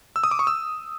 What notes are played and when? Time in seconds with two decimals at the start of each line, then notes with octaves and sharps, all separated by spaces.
0.16 E6
0.24 D#6
0.31 D6
0.39 C#6
0.47 E6